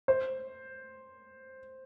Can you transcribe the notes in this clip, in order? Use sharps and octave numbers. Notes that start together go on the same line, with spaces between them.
C5